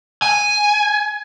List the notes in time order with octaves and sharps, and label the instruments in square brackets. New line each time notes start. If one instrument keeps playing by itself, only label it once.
[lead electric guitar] G#5